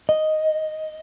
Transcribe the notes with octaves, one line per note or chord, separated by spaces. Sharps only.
D#5